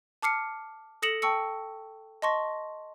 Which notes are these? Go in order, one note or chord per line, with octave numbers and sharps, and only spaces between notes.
A5 D6 F6 C7 C#7
A4 D#6 A#6 C#7 E7 F#7
G5 A5 C#6 E6 C#7
D#5 A5 C6 C#6 A#6